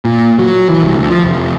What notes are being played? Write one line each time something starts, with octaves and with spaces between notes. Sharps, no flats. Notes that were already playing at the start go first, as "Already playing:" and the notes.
A#2
F#3
E3
C2
D2
F3
F1